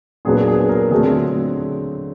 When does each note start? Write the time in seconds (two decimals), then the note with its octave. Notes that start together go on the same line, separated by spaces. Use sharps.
0.25 A#2 F#3 B3 D4 G#4
0.47 G#4
0.69 A#4
0.91 D3 F#3 A3 C4 G#4